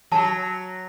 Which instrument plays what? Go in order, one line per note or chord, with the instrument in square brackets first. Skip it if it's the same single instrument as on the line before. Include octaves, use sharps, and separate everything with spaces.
[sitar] F#3 [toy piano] A5